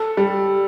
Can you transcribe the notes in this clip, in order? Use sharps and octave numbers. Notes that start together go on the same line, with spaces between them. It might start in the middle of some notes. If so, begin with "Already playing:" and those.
Already playing: A4
G3